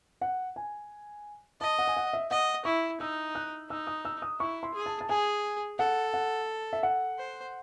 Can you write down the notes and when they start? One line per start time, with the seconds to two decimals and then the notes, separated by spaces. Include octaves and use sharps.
0.21 F#5
0.56 G#5
1.61 D#5 A5
1.79 F#5
1.87 G#5
1.97 F#5
2.13 E5
2.31 D#5 F#5
2.65 E4 C#6
3.00 D#4 E6
3.35 F#6
3.70 D#4 E6
3.87 D#6
4.05 E6
4.22 D#6
4.40 E4 C#6
4.63 C6
4.74 G#4
4.86 A5
5.01 A5
5.09 G#4 G#5
5.79 A4 F#5
6.14 F#5
6.73 E5
6.83 F#5
7.18 C5